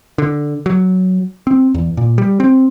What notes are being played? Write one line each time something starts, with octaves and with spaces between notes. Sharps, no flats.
D3
F#3
C4
E2
A#2
G3
C4